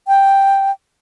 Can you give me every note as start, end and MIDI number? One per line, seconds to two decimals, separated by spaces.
0.08 0.71 79